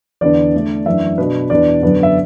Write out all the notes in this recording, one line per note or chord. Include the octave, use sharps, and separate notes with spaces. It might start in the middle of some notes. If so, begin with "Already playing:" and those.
E2 D3 B3 D4 D5
D3 A3 D4
F#2 E3 D4 E5
B2 B3 D4 B4
E2 B2 B3 D4 D5
F#2 D3 B3 D4
E5